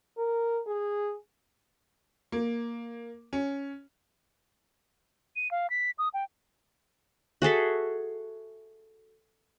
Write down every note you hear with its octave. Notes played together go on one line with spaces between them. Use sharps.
A#4
G#4
A#3
C#4
D#7
F5
B6
D#6
G5
F#4 G#4 A4 E5